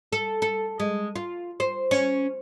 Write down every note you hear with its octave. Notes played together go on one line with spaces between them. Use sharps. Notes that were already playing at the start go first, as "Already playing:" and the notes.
A4
A4
G#3
F4
C5
C#4